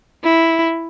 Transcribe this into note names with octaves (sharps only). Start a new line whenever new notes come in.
E4